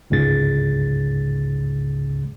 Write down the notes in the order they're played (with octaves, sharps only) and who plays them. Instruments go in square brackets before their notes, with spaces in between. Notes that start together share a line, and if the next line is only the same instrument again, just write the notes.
[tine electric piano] G1 C#2 G#2 C#3 A6